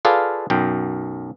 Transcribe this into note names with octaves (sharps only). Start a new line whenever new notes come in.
F4 G#4 A4 B4 D5 F5
B1 F#2 G5